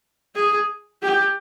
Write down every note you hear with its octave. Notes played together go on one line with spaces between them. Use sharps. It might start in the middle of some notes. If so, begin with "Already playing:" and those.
G#4
G4